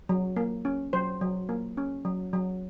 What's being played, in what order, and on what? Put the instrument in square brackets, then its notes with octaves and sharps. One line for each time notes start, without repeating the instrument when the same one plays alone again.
[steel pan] F#3
A#3
C#4
F#3 C5
F#3
A#3
C#4
F#3
F#3